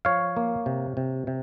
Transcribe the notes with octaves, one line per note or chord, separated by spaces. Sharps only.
F3 C#5 F5
A#3
C3
C3
C3